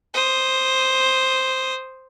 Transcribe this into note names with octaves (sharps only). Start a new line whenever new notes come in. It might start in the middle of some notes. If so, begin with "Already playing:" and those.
C5 D#6